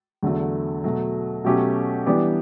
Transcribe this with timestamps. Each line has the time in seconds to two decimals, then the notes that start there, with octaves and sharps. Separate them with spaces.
0.23 E2 D3 F#3 A3
0.84 B2 F#3 A3
1.44 B2 F#3 A3 C#4 G4
2.06 E3 G3 B3 D4 G4